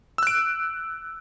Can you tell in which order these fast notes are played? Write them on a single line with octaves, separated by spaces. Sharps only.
E6 F#6 D7